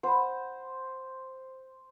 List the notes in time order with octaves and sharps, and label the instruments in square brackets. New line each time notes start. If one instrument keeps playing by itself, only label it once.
[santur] C5 [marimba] F#5 B5